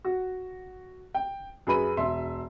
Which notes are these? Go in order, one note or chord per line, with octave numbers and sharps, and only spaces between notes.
F#4
G5
F#2 G#4 B4 B5 D#7
E1 E5 C6